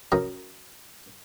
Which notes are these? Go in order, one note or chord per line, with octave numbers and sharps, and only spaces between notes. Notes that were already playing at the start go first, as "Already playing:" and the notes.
F#2 A#4 D#6